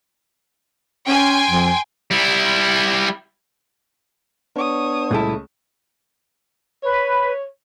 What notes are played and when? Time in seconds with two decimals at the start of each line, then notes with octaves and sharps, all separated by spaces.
1.07 C#4 G5 G#5 C6
1.50 F2
2.11 G3 E4
4.56 B3 D4 C#5 D#6
5.11 C#2 A#2 G3 A3 E4 A5
6.83 B4 C#5